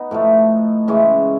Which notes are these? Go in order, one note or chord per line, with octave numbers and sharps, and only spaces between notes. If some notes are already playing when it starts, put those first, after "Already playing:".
Already playing: B3 D#4
A2 F3 A3
C#3 E3 G#3 C#4